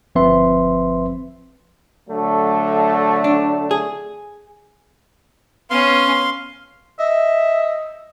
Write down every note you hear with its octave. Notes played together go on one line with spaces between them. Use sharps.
G1 F3 C4 B4 E5 C6
D3 F#3 A3
D4
G#4
B3 C#4 F5 C6
D#5 E5